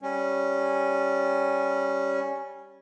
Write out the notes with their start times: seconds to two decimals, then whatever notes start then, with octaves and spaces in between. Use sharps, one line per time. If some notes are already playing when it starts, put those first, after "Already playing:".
0.02 G3 C#4